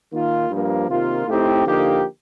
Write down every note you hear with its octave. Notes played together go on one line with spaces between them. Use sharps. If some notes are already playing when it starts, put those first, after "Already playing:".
D#3 A#3 F4
G2 F3 A#3
C3 D#3 A#3 F4
A2 A3 C4 D#4 G4
D3 F3 A#3 D#4 G4